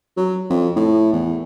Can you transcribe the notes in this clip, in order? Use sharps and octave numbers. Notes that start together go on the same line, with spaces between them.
F#3
F2
A2
E2